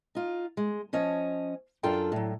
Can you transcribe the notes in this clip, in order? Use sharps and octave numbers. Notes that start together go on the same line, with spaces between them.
D#4 F4
G#3
F3 C#4 C#5 D#5
F#2 D4 F4 A4 G5 A#5
A2 F#3